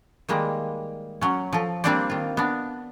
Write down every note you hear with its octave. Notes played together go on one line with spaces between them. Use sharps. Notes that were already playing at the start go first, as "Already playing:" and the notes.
D#3 G3 G#3 A#3
F#3 C#4
F3 A4
G3 A#3 C4 D4 C5 D5
D#3 F4
B3 D4